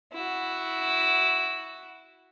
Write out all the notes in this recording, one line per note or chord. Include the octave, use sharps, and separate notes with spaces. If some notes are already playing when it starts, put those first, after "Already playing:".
E4 F#4